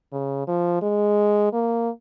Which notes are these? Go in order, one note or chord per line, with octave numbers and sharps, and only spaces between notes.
C#3
F3
G#3
A#3